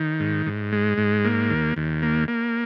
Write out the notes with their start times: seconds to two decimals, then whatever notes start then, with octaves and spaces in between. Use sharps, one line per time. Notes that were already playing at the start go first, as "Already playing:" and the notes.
Already playing: D#3
0.20 G#2
0.46 G#2
0.72 G#3
0.98 G#2
1.25 A#3
1.50 D#2
1.76 D#2
2.03 A#3
2.28 A#3